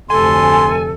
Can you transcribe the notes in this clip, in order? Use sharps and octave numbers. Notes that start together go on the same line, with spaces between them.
F1 D2 C3 A4 G#5 C6